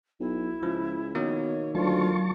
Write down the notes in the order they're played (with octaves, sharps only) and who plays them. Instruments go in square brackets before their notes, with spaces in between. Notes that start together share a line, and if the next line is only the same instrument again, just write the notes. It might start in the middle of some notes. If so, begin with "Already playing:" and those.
[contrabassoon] B1 [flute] E4
[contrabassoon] C#2 [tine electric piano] F3
[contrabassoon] B2 [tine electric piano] D#3 A#3 [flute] C#5
[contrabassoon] D2 [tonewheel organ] F#3 A5 C#6 [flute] F4